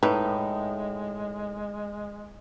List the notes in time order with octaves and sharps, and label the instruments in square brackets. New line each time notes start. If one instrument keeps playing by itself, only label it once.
[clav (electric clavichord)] A2 [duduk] G#3 [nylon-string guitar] D#4 [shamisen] B4